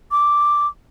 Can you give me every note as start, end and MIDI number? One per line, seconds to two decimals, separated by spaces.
0.11 0.67 86